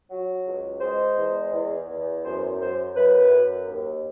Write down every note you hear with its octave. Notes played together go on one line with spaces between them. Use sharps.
F#3
C#2
G#3 C5
E2
E2
E2
F#2 C5
F#2 C5
F#2 B4
F#2
D#2